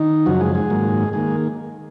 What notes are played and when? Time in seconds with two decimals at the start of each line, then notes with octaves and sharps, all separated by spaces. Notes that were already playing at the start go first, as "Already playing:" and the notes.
Already playing: D#3 D#4
0.26 F#2 C#3 F3 F#3 F#4
0.40 G#3 G#4
0.55 G#3 G#4
0.70 G#2 D#3 F#3 A#3
1.13 D#3 G#3 A#3 G#4